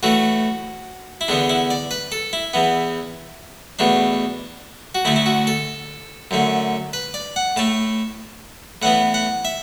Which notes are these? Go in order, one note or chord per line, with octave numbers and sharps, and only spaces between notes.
A2 E3 A3 F#4
E4
E2 D3 B3 D4
E4
D5
B4
A4
E4
E2 E3 B3
E2 B2 A3 D4
F#4
D2 D3 A3 E4
E4
F#4
A4
F#2 D3 A3
B4
D5
F#5
A2 A3 A5
A2 E3 B3 F#5
F#5
E5